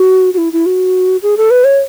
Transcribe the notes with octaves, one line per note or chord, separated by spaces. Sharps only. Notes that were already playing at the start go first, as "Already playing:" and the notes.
Already playing: F#4
F#4
E4
E4
F#4
G#4
A4
B4
C#5